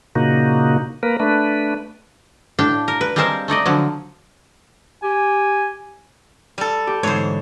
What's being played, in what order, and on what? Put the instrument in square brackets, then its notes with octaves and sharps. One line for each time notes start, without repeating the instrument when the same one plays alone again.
[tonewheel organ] A#2 C#3 A#3 D#4 F#4
A#3 A#4 B4
A3 D4 B4
[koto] A2 D4 F5 G5
A#4
B4
G3 G#3 C4 A#4 F5 A5
A3 D#4 D5 D#5
D3 F3 F#3
[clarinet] G4 [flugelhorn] G#5
[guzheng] G3 A4
[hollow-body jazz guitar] G4
[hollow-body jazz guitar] G#2 D3 E3 [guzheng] C5 C#5